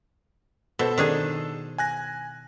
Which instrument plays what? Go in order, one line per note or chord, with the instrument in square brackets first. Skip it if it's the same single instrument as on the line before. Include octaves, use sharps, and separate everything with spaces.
[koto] B2 [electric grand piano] A4 C5
[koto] D#3 D4 G#4
[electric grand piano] G#5 F#6 A#6